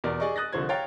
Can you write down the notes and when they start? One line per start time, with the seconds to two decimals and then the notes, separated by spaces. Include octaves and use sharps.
0.04 E2 B2 A#4 D5
0.20 G#4 D5 D#5 C#6
0.36 D#6 F#6 A6 A#6
0.53 C2 D3 F3 C5 C#6 G#6
0.69 C#5 F5 G5 A#5 A6